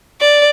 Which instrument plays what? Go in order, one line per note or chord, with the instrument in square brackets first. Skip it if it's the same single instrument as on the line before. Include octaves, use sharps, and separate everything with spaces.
[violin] D5